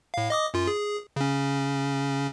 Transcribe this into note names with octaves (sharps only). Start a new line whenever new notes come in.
A2 F5
D#5 D6 D#6
F#2 F4
G#4
C#3 C#4